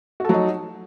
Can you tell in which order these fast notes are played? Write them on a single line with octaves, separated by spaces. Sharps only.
F#4 A4 F#3 D#4